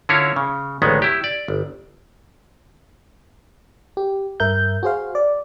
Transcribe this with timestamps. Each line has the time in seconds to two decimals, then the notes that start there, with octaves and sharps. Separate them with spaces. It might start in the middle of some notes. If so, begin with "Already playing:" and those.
0.09 D3 C#4 E4 F4 A#4 C#5
0.36 C#3
0.82 A1 D2 D#3 G#3 B3
1.02 E4 G4
1.24 D5
1.48 G1
3.97 G4
4.40 G2 A#4 E5 G6
4.83 F#4 G#4 C5 F5
5.15 D5